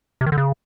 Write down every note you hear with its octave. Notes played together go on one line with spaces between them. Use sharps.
C3
D#3
D3
C#3